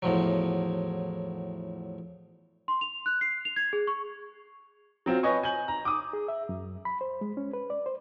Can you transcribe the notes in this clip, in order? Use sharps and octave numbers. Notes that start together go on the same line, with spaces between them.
E2 A2 F3 F#3
C6
F7
F#6
C7
F7
G#6
G#4
C#6
F#3 C4 F4
B4 C#5 D#5 G#5 C#6
G#5 G6 F#7
A#5
D6 D#6
G#4
E5
F#2
B5
C5
G#3
C#4
B4
D5
C5